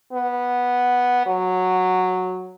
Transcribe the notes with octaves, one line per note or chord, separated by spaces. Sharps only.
B3
F#3